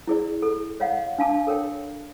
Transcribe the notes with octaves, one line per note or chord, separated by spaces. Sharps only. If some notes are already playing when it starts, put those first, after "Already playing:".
E4 G#4 D5
A4
C#5 D#5 F5 F#5
D4 F5 A5 D6
A4 A#4 C#5 G5